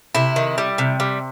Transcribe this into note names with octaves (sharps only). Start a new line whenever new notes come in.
C3 E4
D#3
G3
C3
G3